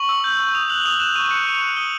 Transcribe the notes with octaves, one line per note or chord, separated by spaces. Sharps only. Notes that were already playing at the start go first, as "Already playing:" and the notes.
Already playing: C#6 F#7
E6
G6
C#6
D#6 F7
F#6 F#7
D#6 F7
F#6 E7
C#6 D#7
F#6 C#7
C#6 D#7
F#6 F7
D#6 G7